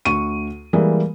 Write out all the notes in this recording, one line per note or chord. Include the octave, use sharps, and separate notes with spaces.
D2 C#6 D#7
E3 G3 G#3 A#3